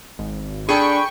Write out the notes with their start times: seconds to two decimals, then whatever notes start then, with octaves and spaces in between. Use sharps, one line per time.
0.18 G#1
0.69 D4 G#4 A4 G5 B5 C#6